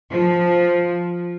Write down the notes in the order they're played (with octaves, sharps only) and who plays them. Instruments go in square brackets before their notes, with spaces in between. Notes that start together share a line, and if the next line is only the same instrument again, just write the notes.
[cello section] F3